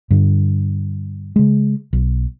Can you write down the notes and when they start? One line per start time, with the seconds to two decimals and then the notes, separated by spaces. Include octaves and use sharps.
0.11 G2 D3
1.36 C#3 G#3
1.93 B1